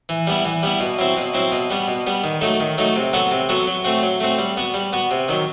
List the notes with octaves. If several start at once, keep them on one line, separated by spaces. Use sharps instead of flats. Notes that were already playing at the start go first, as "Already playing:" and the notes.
E3
G3 B3 E4
E3
G3 B3 E4
B2
F#3 C4 E4
B2
F#3 C4 E4
B2
G3 B3
B2
G3 B3
D#3
F#3 A3 D#4 A4
D#3
F#3 A3 D#4 A4
C3
F#3 B3 F#4 A4
C3
F#3 B3 F#4 A4
F#3
A3 C4 F#4
F#3
A3 C4 F#4
G3
B3 F#4
G3
B3 F#4
C3
D#3 F#3